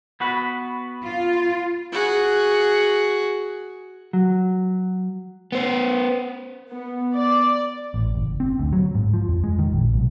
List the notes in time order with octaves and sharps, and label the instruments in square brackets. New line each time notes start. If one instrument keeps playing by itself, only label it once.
[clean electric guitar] B3 F#4 B4
[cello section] F4
[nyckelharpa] F#4 G#4
[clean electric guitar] F#3
[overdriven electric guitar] B3 C5
[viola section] B3
D5
[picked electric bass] A1
F#1
C4
D2
F#3
G#2
F3
F2
G#3
D#3
A#1
B1